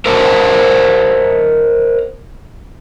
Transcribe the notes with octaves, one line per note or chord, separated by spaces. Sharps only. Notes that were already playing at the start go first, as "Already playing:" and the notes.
A#4 C5 D#5 E5 F#5 A5